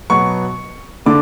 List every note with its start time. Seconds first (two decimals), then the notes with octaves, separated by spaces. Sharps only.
0.10 B2 F#3 B3 C#6
1.06 D3 A3 D4 D6